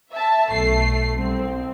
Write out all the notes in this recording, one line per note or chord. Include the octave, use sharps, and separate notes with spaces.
E5 A5
B1 A3 C7
C2 C4